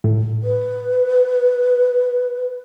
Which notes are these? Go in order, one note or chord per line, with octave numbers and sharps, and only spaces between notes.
A2
B4